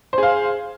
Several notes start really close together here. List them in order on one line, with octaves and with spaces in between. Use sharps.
C5 G#4 F5